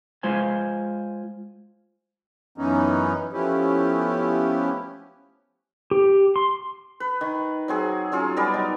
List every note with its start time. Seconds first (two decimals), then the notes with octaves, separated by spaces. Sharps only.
0.23 G#3 F4 C5 G#5
2.58 F#2 E3 B3 C#4 D#4
3.33 F3 A3 B3 C#4 E4 G4
5.91 G4
6.36 C6
7.00 B4
7.21 D#3
7.68 F#3 C4 G#4
8.12 F#3 C#4 F4 G#4
8.36 G3 B3 A#4 D5
8.54 F#3 D#4